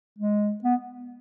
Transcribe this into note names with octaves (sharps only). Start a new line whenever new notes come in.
G#3
B3